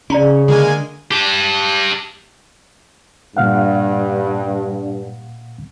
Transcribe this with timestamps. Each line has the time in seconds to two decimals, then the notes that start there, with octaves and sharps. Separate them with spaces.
0.10 C#3 C#4 D5 A#5 C6
0.48 D3 G#3 A#3 G#5
1.11 G4 A5
3.37 G2 A#2 F5 F#5